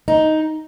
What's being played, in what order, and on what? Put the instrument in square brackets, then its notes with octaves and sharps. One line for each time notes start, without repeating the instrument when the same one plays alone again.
[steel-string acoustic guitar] D#4